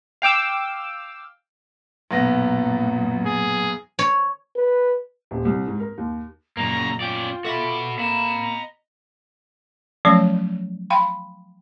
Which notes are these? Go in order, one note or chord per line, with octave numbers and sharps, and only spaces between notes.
F5 G5 D6 E6
B1 F#2 A#2 B3 A#6
G#4
C#5
B4
D#1
C2
G#2
A#4
D#2
F#2 A#2 C#3 A#3 A#5
C#4 F4 D5 G5
F#4 A4 E5 B5 D6
A#3 D#5 B5 E7
A#5
F3 F#3 A3 C#4 C#5 D5
F5 G5 B5 C6